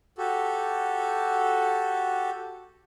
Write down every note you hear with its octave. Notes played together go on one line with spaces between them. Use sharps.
F#4 G4 A4